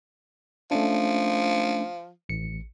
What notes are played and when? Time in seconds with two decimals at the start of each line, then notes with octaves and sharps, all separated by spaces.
0.71 F3 A3 C#4 D4
2.29 A1 C#7